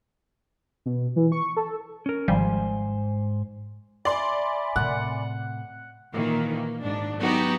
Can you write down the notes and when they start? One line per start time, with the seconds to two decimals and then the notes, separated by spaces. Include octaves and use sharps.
0.86 B2
1.16 E3
1.32 C#6
1.57 A4
2.06 C#4 A#4
2.28 G#1 G#2 F3 G3 C5 G#5
4.05 D5 E5 G#5 B5 C6
4.76 A2 C3 F#5
6.13 A#2 D#3 E3 A#3
6.53 A#3
6.84 G#1 G#2 D4
7.18 F#3 B3 D#4 F#4 G4